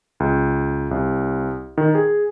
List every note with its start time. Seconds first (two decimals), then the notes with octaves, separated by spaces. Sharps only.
0.20 C#2
0.91 C2
1.78 D#3
1.95 G#4